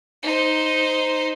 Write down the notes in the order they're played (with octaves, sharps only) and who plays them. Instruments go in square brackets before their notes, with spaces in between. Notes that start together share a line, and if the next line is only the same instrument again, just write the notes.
[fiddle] D#4 C5